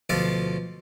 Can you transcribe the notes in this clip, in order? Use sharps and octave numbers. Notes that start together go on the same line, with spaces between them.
D2 B2 F3 A4 F5 D6